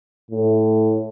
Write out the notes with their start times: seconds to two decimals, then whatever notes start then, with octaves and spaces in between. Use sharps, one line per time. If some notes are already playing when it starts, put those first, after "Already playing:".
0.31 A2